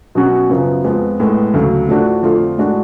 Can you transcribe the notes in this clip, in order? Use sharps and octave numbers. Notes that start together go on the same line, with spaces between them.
B2 F#3 C#4 F#4
F#2 C#3 F3 B3
F2 F3 G#3 B3
A2 G#3 B3
D2 C#3 F#3 A3
A2 F3 A3 D4 F#4
F2 D3 F3 A3 F4
A2 G#3 D4 F#4